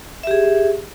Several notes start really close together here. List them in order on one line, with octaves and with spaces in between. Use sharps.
E5 G4 G#4